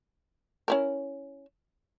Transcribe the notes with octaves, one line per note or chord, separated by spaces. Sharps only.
C#4 E4 A#4